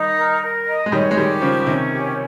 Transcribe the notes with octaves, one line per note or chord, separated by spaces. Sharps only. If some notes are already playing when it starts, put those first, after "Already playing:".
Already playing: D#3 G3 D#4
A#4
A#4
D#5
G#3
D#3 G3 C#5
G#3
D#3 G3 G4
C#3 F3 C#6
C3 D#3 C#4
G4